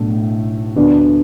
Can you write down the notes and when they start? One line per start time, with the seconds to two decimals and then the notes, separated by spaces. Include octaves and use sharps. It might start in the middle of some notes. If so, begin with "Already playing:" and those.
Already playing: B1 A2 A3 D4
0.76 D2 D3 B3 D4